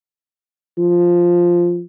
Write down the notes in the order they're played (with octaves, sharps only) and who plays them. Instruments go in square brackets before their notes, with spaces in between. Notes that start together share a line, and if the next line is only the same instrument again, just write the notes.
[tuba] F3